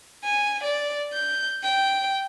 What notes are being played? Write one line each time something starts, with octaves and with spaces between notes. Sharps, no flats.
G#5
D5
G6
G5